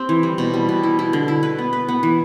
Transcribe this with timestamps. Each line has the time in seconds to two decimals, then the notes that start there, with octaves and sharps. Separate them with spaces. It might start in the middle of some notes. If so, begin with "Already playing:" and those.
Already playing: C4 G4
0.09 E3
0.23 G3
0.38 B2
0.54 G3
0.69 B2
0.83 E4
0.99 E4
1.13 D3
1.28 E4
1.43 B4
1.59 B3
1.73 B4
1.88 B3
2.03 E3